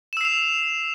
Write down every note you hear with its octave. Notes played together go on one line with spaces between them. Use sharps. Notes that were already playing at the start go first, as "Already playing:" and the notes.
E6 C7 E7 F7